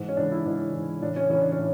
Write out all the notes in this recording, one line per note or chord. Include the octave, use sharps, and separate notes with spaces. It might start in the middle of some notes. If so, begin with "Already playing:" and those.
Already playing: G#2 E3
C#4
G#2 E3 D4
E4
G#2 E3 D4
G#2 E3
A2 E3 D4
C#4
A2 E3 C#4
D4
C#4
A2